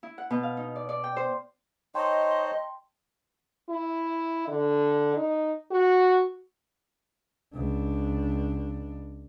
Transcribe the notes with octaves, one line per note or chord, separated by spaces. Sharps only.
E4
F#5
B2
F5
D#4
D5
D5
G5
C5
D#4 C5 C#5 D#5 G5 A5 C6
E4
D3
D#4
F#4
C#2 D4